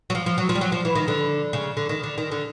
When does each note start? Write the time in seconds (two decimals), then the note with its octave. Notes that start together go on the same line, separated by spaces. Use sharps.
0.10 F#3
0.15 F3
0.26 F3
0.38 F#3
0.49 F3
0.55 G3
0.61 F#3
0.72 F3
0.85 E3
0.95 D#3
1.08 D3
1.53 C#3
1.77 D3
1.89 D#3
2.03 D3
2.18 D#3
2.32 D3